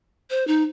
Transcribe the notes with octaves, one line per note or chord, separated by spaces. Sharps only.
C5
D#4